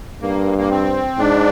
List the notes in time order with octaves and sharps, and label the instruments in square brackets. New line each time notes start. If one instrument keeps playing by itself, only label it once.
[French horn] G2 [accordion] A#3
[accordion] A#3
C4
[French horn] G#2 [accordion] D4